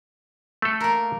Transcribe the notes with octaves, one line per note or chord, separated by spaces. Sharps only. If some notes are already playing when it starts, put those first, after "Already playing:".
A3 A4
A#3 A#4